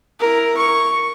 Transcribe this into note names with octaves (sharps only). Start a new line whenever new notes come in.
E4 A#4
C#6